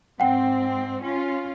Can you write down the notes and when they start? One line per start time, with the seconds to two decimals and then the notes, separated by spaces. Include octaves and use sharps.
0.20 G#2 C4 F#5 G5
1.02 C#4 F4